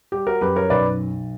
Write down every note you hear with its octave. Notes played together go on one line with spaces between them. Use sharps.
G3 G4
F#4 A#4
F#2 G4 B4
A#4 C#5
B1 B4 D5